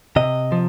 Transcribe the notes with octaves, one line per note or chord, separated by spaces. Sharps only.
C3 D#5
F3